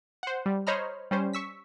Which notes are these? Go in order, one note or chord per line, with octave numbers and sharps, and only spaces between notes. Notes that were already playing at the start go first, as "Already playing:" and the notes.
C5 F#5
G3
C5 C#5 D#5 A#5 B5 F6
G3 C#4 C5
C#6 E6 B6